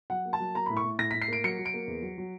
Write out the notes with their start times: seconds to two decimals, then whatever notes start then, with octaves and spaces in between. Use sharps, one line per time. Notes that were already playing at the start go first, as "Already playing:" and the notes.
0.10 F#3 F#5
0.25 A#3
0.33 A5
0.40 F#3
0.55 A#3 A#5
0.66 A2 B5
0.77 C#6
0.84 A2
0.99 A2 A#6
1.11 A2 B6
1.22 C7
1.28 A#3 D7
1.44 F#3 C#7
1.59 F#3
1.66 D7
1.74 A#3
1.87 E2
2.02 F#3
2.18 F#3